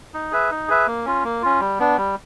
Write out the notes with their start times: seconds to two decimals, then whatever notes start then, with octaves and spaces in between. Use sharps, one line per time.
0.14 D#4
0.32 G#4 B4 E5
0.51 D#4
0.68 G#4 B4 E5
0.87 A#3
1.06 C#4 F4
1.24 A#3
1.42 C#4 F4
1.60 G3
1.79 B3 D4
1.97 G3